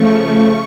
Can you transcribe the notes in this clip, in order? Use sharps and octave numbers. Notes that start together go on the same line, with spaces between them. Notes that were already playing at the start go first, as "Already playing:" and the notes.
Already playing: C#3 F3 A3 C#6